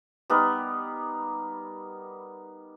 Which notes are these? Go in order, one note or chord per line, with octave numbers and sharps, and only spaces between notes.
G3 B3 D#4 A#4